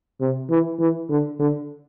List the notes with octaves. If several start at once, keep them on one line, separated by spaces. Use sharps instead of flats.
C3
E3
E3
D3
D3